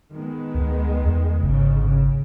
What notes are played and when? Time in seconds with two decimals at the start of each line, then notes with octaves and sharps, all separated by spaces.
0.13 D#3 G#3 B3
0.55 D2
1.04 E2
1.43 G#1 G#2 C#3
1.84 C#3